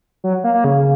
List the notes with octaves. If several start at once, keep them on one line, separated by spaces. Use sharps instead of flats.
F#3
A#3
A#3
C#3